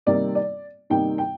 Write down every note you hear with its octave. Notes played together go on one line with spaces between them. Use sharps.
C3 D#3 G3 A#3 D#4 D5
D5
C3 D#3 G3 A#3 D#4 G5
G5